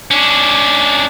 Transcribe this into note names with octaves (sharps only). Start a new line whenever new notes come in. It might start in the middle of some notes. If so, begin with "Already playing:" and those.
C#4 D4